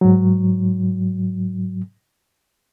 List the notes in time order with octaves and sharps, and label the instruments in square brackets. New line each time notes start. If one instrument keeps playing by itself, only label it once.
[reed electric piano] G#2 F#3